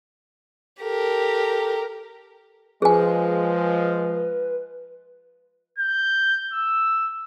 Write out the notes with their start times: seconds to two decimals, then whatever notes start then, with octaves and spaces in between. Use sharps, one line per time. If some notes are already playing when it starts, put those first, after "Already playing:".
0.83 G4 A4 A#4
2.82 F3 G#3 G#4 B4 G#5
5.79 G6
6.53 E6